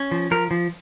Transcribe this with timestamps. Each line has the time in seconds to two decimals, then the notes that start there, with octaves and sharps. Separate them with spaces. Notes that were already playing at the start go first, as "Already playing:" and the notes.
Already playing: C#4
0.11 F3
0.31 F3 A#4
0.51 F3